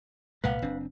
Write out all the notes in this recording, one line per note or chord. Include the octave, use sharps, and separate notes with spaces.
C2 A#2 G#3 B4 F5 F#5
F#1 C4 D4